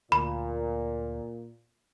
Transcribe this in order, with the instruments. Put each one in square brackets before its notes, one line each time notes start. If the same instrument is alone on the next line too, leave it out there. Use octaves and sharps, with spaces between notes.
[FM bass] D2 [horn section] A#2 [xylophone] B5